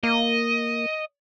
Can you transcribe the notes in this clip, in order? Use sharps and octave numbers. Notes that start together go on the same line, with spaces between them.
A#3 D#5